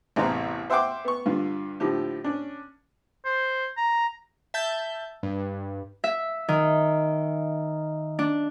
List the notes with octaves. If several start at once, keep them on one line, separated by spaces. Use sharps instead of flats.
A1 E2 C3 C5 A#5
C5 E5 F#5 G5 C6 D6
B3 C#6
G2 D3 F4
A2 D3 F3 G4
C#4 D4
C5
A#5
E5 A5 G6
G2
E5
D#3
D4